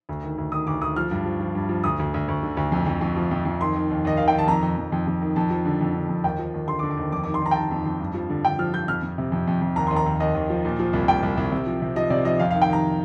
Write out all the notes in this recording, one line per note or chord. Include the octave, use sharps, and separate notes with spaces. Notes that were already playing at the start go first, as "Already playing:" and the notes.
D2
D#3
D2
D#3 D#6
D2 D6
D2 D#6
F3 F6
G2
F3
F3
G2
F3
D2 D#6
D2
D2
D2
D3
D2
F2
F2
F2
F3
F2
F2
D#3 C6
D#3
D#2
D#2 D#5
D#3 F5
G5
D#3
A5
F2 A#5
F2
F2
F2
F2
D#3
F2 A5
F3
D3
F2
D3
F2
D#2 G5
F3
D#2
D3 C6
D6
D3
D6
D#2
F2 D6
D6
D#3
C6
D#3 A#5
G5
D#3 A5
F2
F2
G2
F3
D3
D3 G5
F3 F6
F3 G6
F2 F6
F2
C3
F2
F2
F2
D#2 A#5
D#2 C6
A#5
D#2
D#2 D#5
D#2
F3
A#2
F3
C2
C2 G5
C2
C2
C3
F3
C3
F3 D#5
C3 D5
F3 D#5
F2 F5
F5
D#3
G5
D#3 A#5